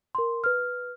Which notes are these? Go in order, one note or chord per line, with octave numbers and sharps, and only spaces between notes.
A#4 C6
B4 F6